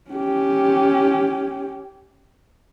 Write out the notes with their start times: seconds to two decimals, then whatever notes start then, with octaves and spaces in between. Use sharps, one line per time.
0.10 C#4 G4